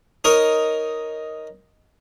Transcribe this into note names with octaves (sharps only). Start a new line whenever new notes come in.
D#4 A#4 C#5